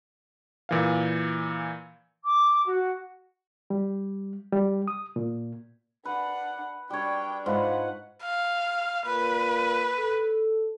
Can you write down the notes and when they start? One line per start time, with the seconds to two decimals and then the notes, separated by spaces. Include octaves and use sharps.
0.69 A#2 E3 F5
2.24 D6
2.66 F#4
3.70 G3
4.53 G3
4.88 D#6
5.16 A#2
6.05 D4 B4 F#5
6.90 G3 D4 C#5 G5
7.46 G#2 F4 B4 F#5
8.22 F5
9.05 A#2 B4
9.99 A4